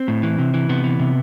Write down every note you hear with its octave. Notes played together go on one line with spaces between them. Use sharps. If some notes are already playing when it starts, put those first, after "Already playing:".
Already playing: C4
A2
E3
C3
E3
C3 B3
E3
C3